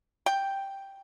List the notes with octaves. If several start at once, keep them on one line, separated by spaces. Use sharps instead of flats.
G5